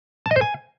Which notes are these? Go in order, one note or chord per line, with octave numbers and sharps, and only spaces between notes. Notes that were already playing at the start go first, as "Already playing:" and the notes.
A5
D#5
C5
G#5